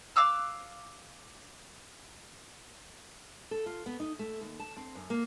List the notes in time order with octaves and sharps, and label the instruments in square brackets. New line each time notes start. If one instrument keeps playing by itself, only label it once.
[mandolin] F5 D6 E6 F#6
[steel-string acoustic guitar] A4
F4
B3
D#4
A3
D#2
A5
C4
F#2
A#3